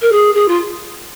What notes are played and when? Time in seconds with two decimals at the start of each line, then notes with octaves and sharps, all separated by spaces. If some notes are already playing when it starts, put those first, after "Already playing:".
0.02 A#4
0.12 G#4
0.34 G#4
0.48 F4